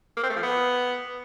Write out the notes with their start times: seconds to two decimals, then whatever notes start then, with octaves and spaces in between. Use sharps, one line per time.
0.17 A#3
0.23 C4
0.30 A3
0.36 F3
0.43 B3